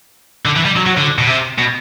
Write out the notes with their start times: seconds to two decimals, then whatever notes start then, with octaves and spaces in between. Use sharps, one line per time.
0.45 D3
0.56 E3
0.65 G3
0.76 F#3
0.86 F#3
0.97 D3
1.18 B2
1.27 C3
1.58 B2